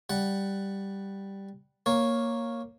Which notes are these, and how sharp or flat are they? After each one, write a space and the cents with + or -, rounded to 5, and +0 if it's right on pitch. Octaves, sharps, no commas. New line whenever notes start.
G3 +0 F#5 +0
A#3 +0 C#5 -5